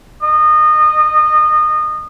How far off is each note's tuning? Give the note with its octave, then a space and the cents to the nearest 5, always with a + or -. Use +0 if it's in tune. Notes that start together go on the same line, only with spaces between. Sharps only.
D#5 -25